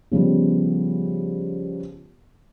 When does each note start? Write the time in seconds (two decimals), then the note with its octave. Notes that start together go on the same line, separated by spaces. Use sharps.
0.12 C#3 F3 G3 B3